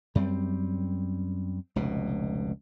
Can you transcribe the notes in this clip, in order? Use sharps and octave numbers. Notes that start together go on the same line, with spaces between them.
F#2 G3 G#3 C4
F1 C#2 B2